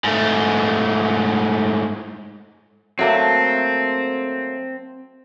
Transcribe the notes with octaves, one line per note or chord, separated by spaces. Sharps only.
G#2 A3
F#3 A3 A#3 C4